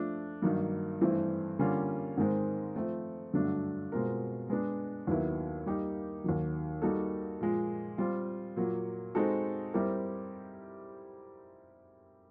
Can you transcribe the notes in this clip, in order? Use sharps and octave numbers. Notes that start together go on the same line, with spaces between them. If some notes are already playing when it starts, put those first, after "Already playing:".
Already playing: F3 A3 D4
G2 D#3 F#3 A#3 D#4
G2 E3 A3 C4 E4
D3 G3 A#3 C#4 F4
G#2 D#3 G#3 C4
F3 A3 C4
G2 D3 F#3 A3 D4
B2 G#3 C4 F4 A#4
G#3 B3 D4
D#2 D#3 F#3 B3 E4
G3 A#3 D#4 G4
D#2 D#3 F#3
G3 A#3 D#4 F#4 A4
A#2 F3 G#3
G3 C4 F4
A#2 F#3 A#3
G#3 C4 D#4 F#4 A4
G3 C4 E4 G4 A#4